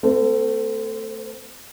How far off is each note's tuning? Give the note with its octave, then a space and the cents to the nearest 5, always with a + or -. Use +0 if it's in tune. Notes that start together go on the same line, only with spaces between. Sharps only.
A3 +15 C4 -40 C5 +0